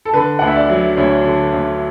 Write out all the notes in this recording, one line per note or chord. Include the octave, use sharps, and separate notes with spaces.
A4
D3 B4
D2 F#5
E5
D5
F#3
D2 C#5
D3
D2